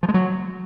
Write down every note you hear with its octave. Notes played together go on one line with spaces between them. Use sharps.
F3
G#3
F#3